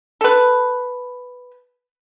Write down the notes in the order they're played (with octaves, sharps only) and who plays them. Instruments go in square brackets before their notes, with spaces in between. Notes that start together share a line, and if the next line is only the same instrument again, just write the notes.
[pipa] A4 B4